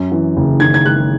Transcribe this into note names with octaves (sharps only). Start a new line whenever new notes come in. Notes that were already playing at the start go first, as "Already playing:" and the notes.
Already playing: F#2
E3
F#1
D#3 G#6
G#6
G#3 F#6